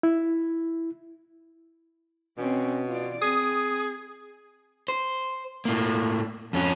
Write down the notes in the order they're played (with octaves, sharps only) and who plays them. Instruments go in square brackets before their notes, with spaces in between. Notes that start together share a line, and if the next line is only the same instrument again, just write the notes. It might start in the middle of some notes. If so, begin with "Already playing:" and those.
[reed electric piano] E4
[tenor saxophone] B2 [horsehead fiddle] C4 C#4
[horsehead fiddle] F4 D5
[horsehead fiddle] C4 [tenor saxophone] G#4 [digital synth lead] D#6
[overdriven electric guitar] C5
A2 A#3
F2 C#4